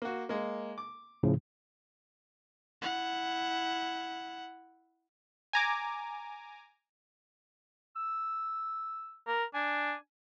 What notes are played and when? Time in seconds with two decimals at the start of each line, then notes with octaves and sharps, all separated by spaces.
0.02 A#3 F#4
0.29 G#3 A#3
0.78 D6
1.23 A2 C#3 F3
2.82 E4 F#5
5.53 G#5 A#5 D6
7.96 E6
9.27 A#4
9.54 D4 G#5